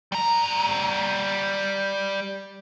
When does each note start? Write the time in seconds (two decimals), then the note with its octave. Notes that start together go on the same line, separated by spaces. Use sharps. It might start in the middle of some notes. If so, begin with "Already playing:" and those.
0.12 G3 A#5